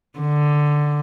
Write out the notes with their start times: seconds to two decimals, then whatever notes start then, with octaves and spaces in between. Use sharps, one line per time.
0.20 D3